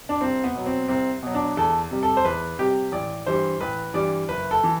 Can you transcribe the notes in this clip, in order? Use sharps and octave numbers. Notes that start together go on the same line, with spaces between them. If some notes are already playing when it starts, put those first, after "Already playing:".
D4
C2 C4
B3
B2 F#3
C4
C2 C4
B2 F#3
D4
E2 A4
C3 G3
A4
C5
E2 B4
C3 G3 G4
A1 D5
G2 E3 G3 C5
A1 B4
G2 E3 G3 D5
F#1 B4
A4
E3